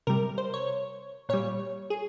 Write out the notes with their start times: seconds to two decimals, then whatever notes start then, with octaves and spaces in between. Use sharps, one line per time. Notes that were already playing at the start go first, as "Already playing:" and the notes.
0.07 C3 G3 A#4
0.38 C5
0.54 C#5
1.29 A#2 G3 C#5
1.90 G#4